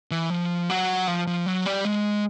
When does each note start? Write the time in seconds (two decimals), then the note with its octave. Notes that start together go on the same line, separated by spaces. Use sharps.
0.11 E3
0.30 F3
0.70 F#3
1.08 F3
1.27 F3
1.46 F#3
1.65 G3
1.85 G#3